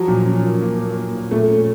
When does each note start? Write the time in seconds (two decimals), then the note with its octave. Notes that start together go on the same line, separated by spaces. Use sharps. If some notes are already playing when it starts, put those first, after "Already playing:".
Already playing: F3 F#3
0.08 A#2
0.26 C#4
0.44 A#3
0.62 A#3
0.79 A#3
0.97 A#3
1.15 A#2
1.31 A#2 A3
1.50 C#4